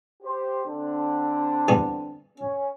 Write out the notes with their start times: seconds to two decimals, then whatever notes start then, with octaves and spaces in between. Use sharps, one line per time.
0.23 G4 C5
0.67 D3 C4 D4
1.68 E2 G3 G#5
2.38 C#4